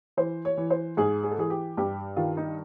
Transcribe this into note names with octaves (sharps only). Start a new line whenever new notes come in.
E3 C5
C#5
E3
C5
G#2 G#4
G#4
A4
E3 G#4
G4
G2 G4
D#3 F4
D#4